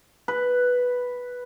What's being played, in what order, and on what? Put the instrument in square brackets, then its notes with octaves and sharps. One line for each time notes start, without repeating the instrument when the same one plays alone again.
[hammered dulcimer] B4